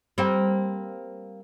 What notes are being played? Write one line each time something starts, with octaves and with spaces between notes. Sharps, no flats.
G3 A#3 C4